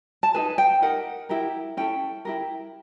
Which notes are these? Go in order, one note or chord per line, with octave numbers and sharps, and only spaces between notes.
A5
D#4 G#4 B4 G#5
G5
D#4 G4 A#4 F#5
E4 G4 A#4
C#4 E4 A4 G5
E4 G4 A#4